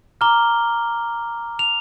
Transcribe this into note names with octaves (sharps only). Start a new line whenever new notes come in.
A#5 D6 F6 G7
F7